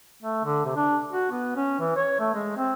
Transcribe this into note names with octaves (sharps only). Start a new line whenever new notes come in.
A3
D3
C3
D4
F#4
B3
C#4
E3
C#5
A3
G#3
C4